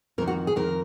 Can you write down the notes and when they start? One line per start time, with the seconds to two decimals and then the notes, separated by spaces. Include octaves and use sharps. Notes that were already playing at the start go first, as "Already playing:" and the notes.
0.18 F2 A#4
0.22 D#3
0.27 F#4
0.47 G#4
0.56 F2 D#3 A#4